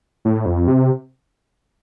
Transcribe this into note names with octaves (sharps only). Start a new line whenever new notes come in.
A2
F2
C3